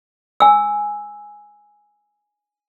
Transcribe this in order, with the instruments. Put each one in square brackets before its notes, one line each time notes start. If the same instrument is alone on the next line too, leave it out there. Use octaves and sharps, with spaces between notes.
[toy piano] G#5 E6